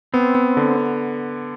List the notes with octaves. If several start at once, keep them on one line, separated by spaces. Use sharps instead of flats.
B3 C4
B3
D3